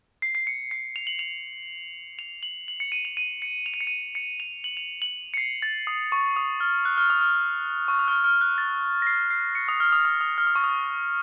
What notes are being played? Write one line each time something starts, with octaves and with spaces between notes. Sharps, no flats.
C7
C7
C#7
C7
F7
F#7
F7
F7
F#7
F#7
C#7
D#7
F7
D#7
C#7
F7
D#7
C#7
D#7
C#7
F7
F#7
F7
F#7
C#7
C7
A6
D#6
C#6
D#6
F6
F#6
F6
D#6
F6
C#6
D#6
F6
F6
F#6
A6
A#6
C7
C7
C#7
D#6
F6
D#6
D#6
D#6
F6
D#6
C#6
D#6